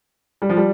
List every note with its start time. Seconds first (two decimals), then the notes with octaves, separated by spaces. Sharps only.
0.42 G3
0.49 F3
0.57 G3